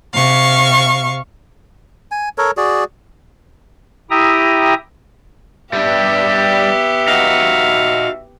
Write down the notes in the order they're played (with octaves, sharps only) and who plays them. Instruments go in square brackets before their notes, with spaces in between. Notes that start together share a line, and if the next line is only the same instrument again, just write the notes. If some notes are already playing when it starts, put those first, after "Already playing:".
[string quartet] C3 F5 C#6
[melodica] G#5
A4 A#4 C#5
F#4 G#4 D5
[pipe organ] E4 G4 E5 G5 A#5 D#6
[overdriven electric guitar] G3 D4 [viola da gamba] B3 G4 [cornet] E5
[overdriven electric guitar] D#4 F#4 [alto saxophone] F5